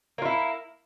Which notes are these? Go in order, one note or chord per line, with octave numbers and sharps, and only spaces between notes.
A#3 E4 F4